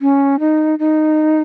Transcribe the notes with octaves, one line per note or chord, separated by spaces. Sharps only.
C#4
D#4
D#4